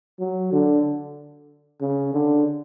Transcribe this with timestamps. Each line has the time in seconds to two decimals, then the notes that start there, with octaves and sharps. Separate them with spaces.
0.19 F#3
0.52 D3
1.81 C#3
2.13 D3